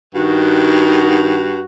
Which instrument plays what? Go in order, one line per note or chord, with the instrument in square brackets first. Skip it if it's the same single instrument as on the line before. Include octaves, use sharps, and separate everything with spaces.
[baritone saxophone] G2 [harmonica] D#3 [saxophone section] F#4